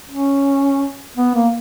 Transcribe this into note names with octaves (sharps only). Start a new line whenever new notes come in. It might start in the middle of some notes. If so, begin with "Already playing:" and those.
C#4
B3
A#3